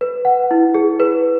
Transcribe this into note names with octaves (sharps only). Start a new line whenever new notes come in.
B4
F#5
E4
G#4
B4